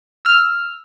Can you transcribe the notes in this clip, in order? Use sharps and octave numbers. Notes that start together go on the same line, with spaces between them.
E6 F6